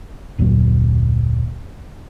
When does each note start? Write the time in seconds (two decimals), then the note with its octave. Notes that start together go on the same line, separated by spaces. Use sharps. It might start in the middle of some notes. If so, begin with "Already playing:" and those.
0.38 F1 D2 A#2 F#3